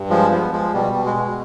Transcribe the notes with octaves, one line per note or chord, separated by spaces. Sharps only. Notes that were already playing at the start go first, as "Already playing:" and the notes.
Already playing: G2
F3 G#3
F3 B3
F3 G#3
B2 G3
B2
G#3
B2